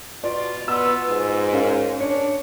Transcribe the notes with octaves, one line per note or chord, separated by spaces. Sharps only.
B2 F4 D5
B3 E6
G#2
C#4 A#4 F5
D4 C#5